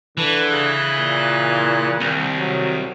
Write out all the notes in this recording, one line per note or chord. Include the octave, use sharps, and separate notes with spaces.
D3 E3 B4 A5 C#6
C#3 F#6
A#2
C2 D#3
F#3